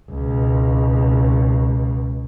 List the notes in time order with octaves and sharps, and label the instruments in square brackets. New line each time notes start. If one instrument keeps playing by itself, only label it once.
[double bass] C#2 B2